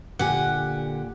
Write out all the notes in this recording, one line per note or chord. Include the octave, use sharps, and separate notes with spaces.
A#2 D3 G4 F#5 G#5